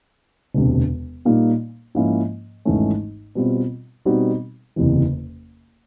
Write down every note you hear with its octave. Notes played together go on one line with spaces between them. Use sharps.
E1 D2 C3
A#2 G3 A#3 D#4
G#2 F3 A#3 C#4 E4
G#1 G#2 E3 A3 C#4
B2 G3 C4 F4
B2 G3 C4 D#4 F#4
F#1 E2 C3 E3